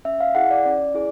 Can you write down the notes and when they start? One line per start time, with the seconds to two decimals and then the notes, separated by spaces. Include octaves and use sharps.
0.05 C#4 E5
0.20 F5
0.35 E4 G#4 F#5
0.51 D5
0.65 C#4 D5
0.94 E4 G#4